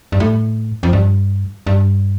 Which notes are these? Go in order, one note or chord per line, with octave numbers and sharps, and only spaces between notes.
G2
A2
F2
G2
G2